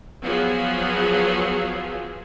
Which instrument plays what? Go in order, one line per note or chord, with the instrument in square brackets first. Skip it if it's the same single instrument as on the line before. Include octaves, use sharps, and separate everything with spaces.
[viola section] F3 F#3 B3 G#4